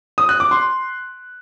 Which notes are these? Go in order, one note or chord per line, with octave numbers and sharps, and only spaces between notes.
D#6
F#6
D6
C6